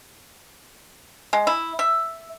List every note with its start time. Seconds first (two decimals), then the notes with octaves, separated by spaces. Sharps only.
1.33 G#3
1.47 E4
1.79 E5